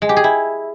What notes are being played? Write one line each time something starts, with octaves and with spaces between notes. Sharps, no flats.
G#3
G4
G#4
E4